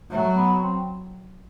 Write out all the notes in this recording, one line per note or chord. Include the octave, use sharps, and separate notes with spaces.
F#3 A3
B3
C4